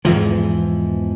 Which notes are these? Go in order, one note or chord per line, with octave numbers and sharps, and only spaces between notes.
E2 G#2 E3 F3